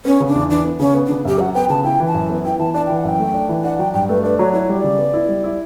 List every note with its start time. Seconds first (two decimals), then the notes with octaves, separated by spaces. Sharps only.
0.05 B3 C#4
0.20 C#3
0.28 D4
0.35 E2
0.50 E3 D4
0.65 B3
0.79 C#3 C#4
0.95 B3
1.06 D4
1.10 C#3
1.25 F#2 G4
1.39 F#3 F#5
1.55 B3 G5
1.70 C#3 A5
1.84 E4 G5
2.00 E3
2.07 A5
2.14 F#2
2.30 B3
2.45 E4 G5
2.59 E3 A5
2.74 D4 A5
2.86 G5
2.90 E3
2.97 F#5
3.04 F#2 G5
3.19 A3
3.34 D4
3.49 E3
3.64 D4 F#5
3.79 F#3 G5
3.94 G2 G5
4.09 A3 B4
4.24 D4 B4
4.39 F#3 C#5
4.54 E4 C#5
4.69 G3
4.77 D5
4.84 C#3
4.99 B3
5.14 E4
5.29 G3
5.44 E4